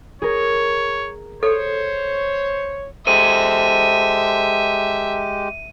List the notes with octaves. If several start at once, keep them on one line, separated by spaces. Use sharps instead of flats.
G#4 A#4 C#5
A4 C5 C#5
G#3 G4 A4 C5 E5 D#7